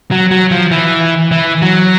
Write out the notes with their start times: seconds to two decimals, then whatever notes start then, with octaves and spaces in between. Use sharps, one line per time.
0.11 F#3
0.31 F#3
0.51 F3
0.71 E3
1.31 E3
1.62 F#3